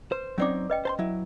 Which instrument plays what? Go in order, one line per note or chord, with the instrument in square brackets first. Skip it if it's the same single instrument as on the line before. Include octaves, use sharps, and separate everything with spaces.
[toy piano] B4 [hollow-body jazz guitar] C5
[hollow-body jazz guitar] F#3 C4 D#4 [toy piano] C#4 D5 D6
[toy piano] B4 D#5 G5
[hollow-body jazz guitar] C5 A5 C6
F#3 E4